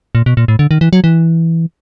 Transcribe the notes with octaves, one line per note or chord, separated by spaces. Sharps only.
A#2
B2
A#2
A2
D3
D#3
E3
F#3
E3